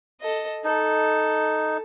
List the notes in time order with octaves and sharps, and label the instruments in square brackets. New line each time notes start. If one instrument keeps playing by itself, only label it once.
[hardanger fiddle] A4 D#5
[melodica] D#4 [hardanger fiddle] A4